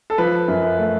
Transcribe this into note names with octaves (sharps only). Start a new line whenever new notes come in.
A4
F3 B4
F#2
A3